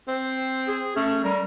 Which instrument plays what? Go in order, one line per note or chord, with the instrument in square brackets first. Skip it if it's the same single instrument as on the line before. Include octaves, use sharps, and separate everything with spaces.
[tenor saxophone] C4
[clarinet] G#4
[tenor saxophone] A3 [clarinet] C#4
[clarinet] G3 [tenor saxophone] A#4